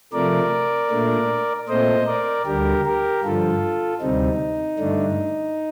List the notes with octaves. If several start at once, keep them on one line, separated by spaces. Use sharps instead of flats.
C3 F3 A3 A#4 D5
A#2 A3 D4
A#2 A3 C4 C5 D#5
A#4 D5
D2 D3 G3 G4 A#4
G4 A#4
G2 D3 F3 F4 A4
D2 C3 G3 C4 D#4
G2 D3 A3 D4